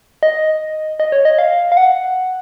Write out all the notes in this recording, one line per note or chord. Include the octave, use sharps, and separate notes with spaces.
D#5
D#5
C#5
D#5
F5
F5
F#5